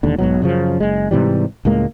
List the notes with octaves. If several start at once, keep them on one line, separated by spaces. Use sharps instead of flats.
E1 D#2 D3
B1 G#2 B2 F#3
F#2 C#3 F3
F#1 G#3
G#2 C3 E3 G3
C#2 A2 G#3 A#3